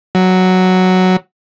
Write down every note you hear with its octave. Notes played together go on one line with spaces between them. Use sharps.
F#3